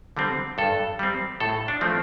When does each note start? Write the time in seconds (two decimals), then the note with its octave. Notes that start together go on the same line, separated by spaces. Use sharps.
0.17 D3 G3 C4
0.58 G2 A4
0.99 G3 C4
1.40 A2 A4
1.68 D4
1.81 F3 A3 C4